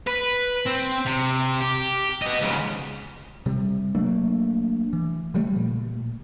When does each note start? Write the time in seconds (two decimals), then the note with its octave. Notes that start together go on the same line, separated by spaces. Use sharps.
0.07 B4
0.67 C4
1.06 C3
1.60 G4
2.22 B3 D#5
2.42 G#2 C#3
3.46 C3 G3
3.95 F#3 A3 A#3 D4
4.93 E3
5.34 C#3 F3 G3 A3
5.56 A#2